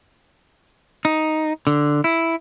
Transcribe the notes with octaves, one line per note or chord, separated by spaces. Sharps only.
D#4
D3
E4